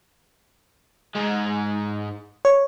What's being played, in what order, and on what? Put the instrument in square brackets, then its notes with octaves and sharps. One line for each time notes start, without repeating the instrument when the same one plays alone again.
[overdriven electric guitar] G#2 G#3
[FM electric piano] C#5